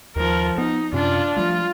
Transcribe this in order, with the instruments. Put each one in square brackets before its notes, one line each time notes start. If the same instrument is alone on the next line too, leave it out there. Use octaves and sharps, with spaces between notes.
[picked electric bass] D#2 [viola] F3 A#4
[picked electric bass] B3 [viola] D#4
[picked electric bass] F#2 C3 C#4 [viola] D4 F4
[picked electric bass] F3 G3 A3 [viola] F4